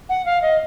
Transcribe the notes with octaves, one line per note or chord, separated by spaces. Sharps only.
F#5
F5
D#5